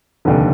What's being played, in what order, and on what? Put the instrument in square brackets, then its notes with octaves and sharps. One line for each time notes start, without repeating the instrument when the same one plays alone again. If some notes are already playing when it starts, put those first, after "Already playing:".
[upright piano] F1 D#2 D3